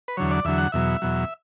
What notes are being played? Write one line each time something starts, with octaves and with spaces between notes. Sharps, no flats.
B4
E2 D3 F#3 C#5
D5
E2 D3 F#3 E5
F#5
E2 B2 F#3 E5
E2 B2 F#3